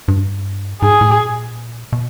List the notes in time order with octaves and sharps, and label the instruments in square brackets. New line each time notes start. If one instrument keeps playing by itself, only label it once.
[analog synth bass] G2
[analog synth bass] G#2 [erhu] G#4
[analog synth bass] A2
A#2
B2